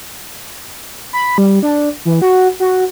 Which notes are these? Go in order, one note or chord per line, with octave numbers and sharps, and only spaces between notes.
B5
G3
D4
E3
F#4
F#4